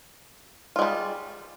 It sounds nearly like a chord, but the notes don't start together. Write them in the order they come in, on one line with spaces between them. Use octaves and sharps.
F4 G#3 G3